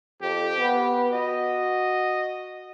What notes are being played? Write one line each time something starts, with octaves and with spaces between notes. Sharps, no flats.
F2 G4
B3
F#4 D#5